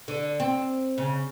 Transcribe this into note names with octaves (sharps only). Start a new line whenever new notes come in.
D3
C4
C#3